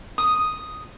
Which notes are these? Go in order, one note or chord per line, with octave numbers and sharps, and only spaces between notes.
D#6